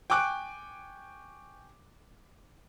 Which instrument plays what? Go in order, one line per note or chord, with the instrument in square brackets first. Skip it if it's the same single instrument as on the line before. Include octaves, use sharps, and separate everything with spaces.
[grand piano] G5 G#5 C#6 D6 F#6 D7